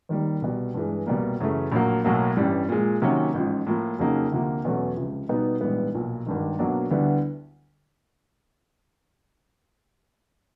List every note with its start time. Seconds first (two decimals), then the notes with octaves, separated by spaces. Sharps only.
0.09 D#2 D#3 G3 A#3
0.42 C2 B2 G3
0.74 G2 E3 G#3
1.07 C2 B2 G3 A#3
1.40 F#2 C#3 E3 A3
1.72 A#1 A2 F#3 A#3
2.04 B1 A2 F#3 A#3
2.37 A1 G2 E3 G3
2.69 A#2 F3 G#3
3.02 C3 D#3 F#3 A#3 C#4
3.34 A1 G#2 F3
3.67 A2 F3 A#3
3.99 F2 C#3 F#3 A#3 D#4
4.32 D2 C3 F3 A#3
4.64 E2 B2 F#3 A3 C#4
4.96 C#2 C3 F3
5.29 B2 G3 B3 D#4
5.61 A#1 G#2 E3 G3 B3
5.94 B1 A#2 F3
6.26 G#1 G2 D#3
6.59 B1 B2 F#3 A#3 D4
6.91 D2 D3 G3 B3 E4